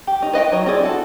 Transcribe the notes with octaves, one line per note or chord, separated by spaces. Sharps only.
G4
D#4
B4 D#5 F5 G5
F#3 D#4 D#5
C4 E4 G#4 D5
E4 F#4 A4